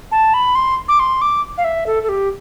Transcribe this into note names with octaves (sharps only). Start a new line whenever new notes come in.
A5
B5
C6
D6
C6
D6
F5
E5
A4
A4
G4